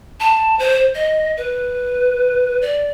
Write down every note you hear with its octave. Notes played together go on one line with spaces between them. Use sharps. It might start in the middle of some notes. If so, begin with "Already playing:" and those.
A5
C5
D#5
B4
D5